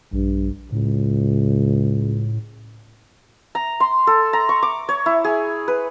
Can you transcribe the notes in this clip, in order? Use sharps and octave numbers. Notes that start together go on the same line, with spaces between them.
A#1 G2
C#2 A2
A#5
C6
A4
A#5
C#6
D6
C#5
E4
G#4
B4